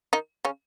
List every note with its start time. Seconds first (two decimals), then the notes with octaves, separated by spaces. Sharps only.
0.13 D#3 D#4
0.45 C#3 C#4